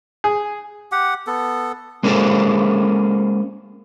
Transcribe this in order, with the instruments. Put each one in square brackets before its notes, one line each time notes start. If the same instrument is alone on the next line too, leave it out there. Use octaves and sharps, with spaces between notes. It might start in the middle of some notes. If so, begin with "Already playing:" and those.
[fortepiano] G#4
[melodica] G4 F#5
B3 A4
[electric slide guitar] G#3 A#3 C#4 G#4 A4 C5